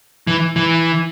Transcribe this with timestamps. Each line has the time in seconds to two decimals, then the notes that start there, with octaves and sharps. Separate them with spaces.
0.27 E3
0.56 E3